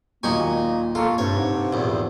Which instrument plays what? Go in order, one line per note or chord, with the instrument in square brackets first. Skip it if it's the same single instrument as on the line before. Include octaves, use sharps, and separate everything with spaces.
[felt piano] D#2 F#3 C#6 [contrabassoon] A#2 [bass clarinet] A#3 [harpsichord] D#4 G#5
[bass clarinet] A#3 [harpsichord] F4 [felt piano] A4 C#6
[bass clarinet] G2 [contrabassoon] C3 [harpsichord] C#5
[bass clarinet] G#2
[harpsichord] A#1 E2